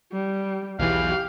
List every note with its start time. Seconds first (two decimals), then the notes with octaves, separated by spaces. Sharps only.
0.12 G3
0.79 B1 E2 E3 G4 F5